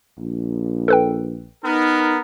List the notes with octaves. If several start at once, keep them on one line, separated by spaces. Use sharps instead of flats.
A#1
A4 B4 G5
B3 D#4 A#4